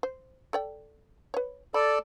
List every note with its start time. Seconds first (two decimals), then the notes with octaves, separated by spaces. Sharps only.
0.03 C5
0.53 A4 D5 G5
1.34 B4 C#5
1.74 A4 D5 B5